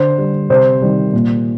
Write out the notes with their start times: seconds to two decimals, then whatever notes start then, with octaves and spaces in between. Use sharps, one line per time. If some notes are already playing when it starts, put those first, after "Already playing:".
Already playing: D3 C5
0.18 G3
0.50 C3 C5
0.82 D#3 G3
1.13 A#2